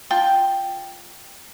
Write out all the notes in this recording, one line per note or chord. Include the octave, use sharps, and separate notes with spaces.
F4 G5 A5